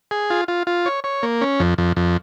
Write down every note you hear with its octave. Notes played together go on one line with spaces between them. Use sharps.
G#4
F4
F4
F4
C#5
C#5
A#3
C#4
F2
F2
F2